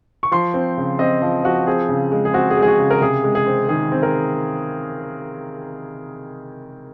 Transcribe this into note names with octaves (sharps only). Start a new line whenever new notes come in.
C#6
F3 C6
C4
C#3
C4 D#5
F3
F3 F#4
C4 G#4
C#3
G#3
G#4
C4 F#4
G#4
G#3
G#4
F#4
C#3
A#4
C3 G#4
G#3
G#4
C4
D#3 G#4
C4
A#4